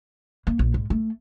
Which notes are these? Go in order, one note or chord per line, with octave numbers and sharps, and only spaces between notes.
A#3
A#1
G#2
A3